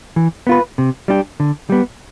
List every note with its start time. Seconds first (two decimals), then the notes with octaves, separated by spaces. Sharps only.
0.16 E3
0.47 B3 F4 B4
0.78 C3
1.08 G3 D4 G4
1.40 D3
1.70 G3 B3